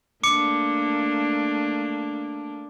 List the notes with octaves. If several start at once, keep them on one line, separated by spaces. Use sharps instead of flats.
A3 A#3 D4 D6 C#7